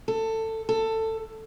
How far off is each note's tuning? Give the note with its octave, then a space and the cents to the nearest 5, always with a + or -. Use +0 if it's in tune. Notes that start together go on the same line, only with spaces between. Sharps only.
A4 +20
A4 +15